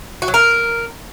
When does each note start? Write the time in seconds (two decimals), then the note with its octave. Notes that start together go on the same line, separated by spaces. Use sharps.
0.22 F#4
0.28 F#3
0.34 A#4